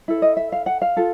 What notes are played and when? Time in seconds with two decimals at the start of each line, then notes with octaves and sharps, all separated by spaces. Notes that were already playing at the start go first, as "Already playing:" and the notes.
0.08 E4 A4
0.22 D#5
0.37 E5
0.52 F5
0.66 F#5
0.82 F5
0.97 F4 A4